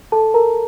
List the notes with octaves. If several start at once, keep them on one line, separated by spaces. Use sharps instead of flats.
A4 A5
A#4 A#5